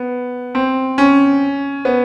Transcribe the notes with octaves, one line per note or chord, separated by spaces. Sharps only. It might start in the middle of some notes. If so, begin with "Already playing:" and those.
Already playing: B3
C4
C#4
B3